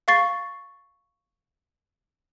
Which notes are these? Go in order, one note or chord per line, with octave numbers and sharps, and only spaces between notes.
F5 C#6 A6 C7